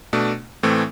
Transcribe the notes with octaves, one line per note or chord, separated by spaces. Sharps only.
B2 A3 D4
A2 E3 A3 C4